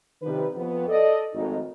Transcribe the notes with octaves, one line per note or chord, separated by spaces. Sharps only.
C3 D#3 F3 G3 D#4 B4
F2 B3
A4 D5 D#5
G#1 F2 A3 D#4